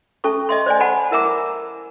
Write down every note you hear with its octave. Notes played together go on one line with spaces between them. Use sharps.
C#4 A4 E5 A5 C#6
D#5 E5 C6
C5 D5 D#5 G#5
F#5 G#5 A5 B5
E4 A#4 E5 A#5 D6